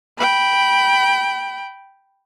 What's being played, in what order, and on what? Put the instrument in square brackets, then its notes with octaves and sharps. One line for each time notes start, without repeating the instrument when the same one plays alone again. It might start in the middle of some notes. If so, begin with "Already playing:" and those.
[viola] G5 B5